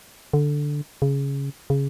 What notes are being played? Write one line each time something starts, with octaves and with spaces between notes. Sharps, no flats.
D3
C#3
C#3